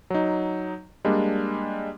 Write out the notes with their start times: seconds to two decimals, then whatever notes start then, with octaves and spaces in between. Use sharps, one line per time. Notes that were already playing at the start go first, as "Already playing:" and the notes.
0.10 F#3 D#4
1.05 G3 G#3 A#3 D4